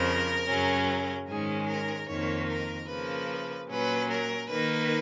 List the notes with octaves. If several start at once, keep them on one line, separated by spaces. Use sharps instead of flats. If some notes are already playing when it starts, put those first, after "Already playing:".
Already playing: F2 C#3 F3 A#4
F#2 C#3 F#3 C#4
G#2 D#3 G#3 C#4 G#4
A#4
F2 D#3 A#3 D#4 C#5
A#4
C#3 F3 A#3 B4
A#2 F#3 C#4 B4
A#4
D#3 A#3 D#4 B4